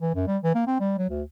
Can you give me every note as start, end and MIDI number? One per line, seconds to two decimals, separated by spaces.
0.01 0.14 52
0.15 0.26 42
0.28 0.37 55
0.43 0.53 52
0.55 0.65 58
0.67 0.79 60
0.80 0.94 55
0.98 1.06 54
1.10 1.23 38